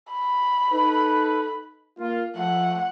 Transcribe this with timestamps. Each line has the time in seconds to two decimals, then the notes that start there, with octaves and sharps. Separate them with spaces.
0.13 B5
0.71 D#4 A4 B4
1.99 A#3 F4
2.36 F3 A3 F#5